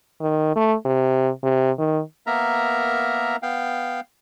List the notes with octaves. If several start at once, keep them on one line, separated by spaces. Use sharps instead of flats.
D#3
A3
C3
C3
D#3
A#3 B3 A#4 E5 A#5
B3 F5 G5